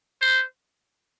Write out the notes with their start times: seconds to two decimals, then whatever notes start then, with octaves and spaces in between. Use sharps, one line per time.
0.22 C5